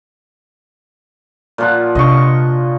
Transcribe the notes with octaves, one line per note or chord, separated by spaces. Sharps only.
A#2 F3 F#5
C3 D4 D#5 C#6